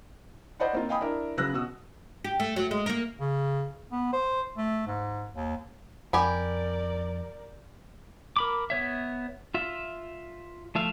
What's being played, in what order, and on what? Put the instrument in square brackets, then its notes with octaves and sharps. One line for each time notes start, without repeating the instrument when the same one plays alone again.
[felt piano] C5 D5 D#5 F5 F#5 B5
A#3 C4 D#4 F4
D#5 F5 G5 G#5 B5 D#6
D4 E4 A#4
C#3 F#3 B4 E6 F#6 A#6
B2 F#4 D#6 E6
[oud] G4
A3
F#3
G#3
A#3 A#4
[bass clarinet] C#3
B3
C5
A3
G#2
D#2
[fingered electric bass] F2 [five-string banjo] G4 G#5 B5 [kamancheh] A#4 D5
[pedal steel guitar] A#4 B5 D6
B3 C#5 E5
F4 E5
F3 A3 E5 F5